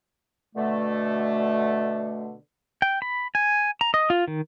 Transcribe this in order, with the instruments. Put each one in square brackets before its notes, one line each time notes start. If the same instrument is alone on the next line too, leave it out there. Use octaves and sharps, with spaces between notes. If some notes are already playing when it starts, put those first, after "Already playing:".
[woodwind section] B2 D3 A3
[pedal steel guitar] G5
B5
G#5
A#5
D#5
F4
D#3